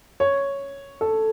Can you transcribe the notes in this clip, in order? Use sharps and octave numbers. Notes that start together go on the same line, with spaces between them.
C#5
A4